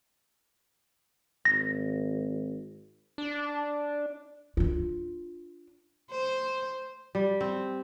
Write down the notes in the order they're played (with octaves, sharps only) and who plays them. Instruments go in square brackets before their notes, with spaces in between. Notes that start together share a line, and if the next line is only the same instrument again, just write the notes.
[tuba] G#1 [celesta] A#6
[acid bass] D4
[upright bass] D4 F4
[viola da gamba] C5
[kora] G3
C4